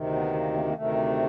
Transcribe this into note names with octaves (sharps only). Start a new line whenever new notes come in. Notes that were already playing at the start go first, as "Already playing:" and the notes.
Already playing: D2 C3 D#3
B3
A#3
A#3
A#3
D2 C3 D#3 A3